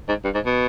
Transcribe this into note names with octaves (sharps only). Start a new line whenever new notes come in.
G#2
G2
G#2
B2